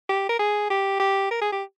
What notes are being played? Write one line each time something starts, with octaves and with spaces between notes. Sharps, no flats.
G4
A#4
G#4
G4
G4
A#4
G#4
G4